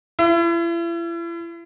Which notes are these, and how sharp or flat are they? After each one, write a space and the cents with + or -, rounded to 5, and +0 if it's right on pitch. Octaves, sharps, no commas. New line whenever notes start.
E4 +40